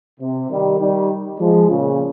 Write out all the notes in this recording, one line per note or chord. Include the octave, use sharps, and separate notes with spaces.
C3
D#3 G3
D#3 G3
F3 G#3
A#2 C#3